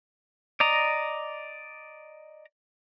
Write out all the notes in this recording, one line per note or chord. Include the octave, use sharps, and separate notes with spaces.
D5 D#5 A#5